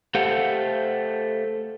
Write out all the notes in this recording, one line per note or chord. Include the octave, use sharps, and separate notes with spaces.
A3 G4 A4 C5 F5 F#5